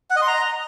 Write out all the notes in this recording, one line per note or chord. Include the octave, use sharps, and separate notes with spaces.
F#5
D#5
C6
A#5